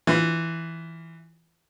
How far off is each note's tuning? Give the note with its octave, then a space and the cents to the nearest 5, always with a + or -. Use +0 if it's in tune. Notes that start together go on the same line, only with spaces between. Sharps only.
E3 +0 F4 +0